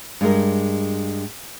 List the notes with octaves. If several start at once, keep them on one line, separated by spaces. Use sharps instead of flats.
G2 G#3 A#4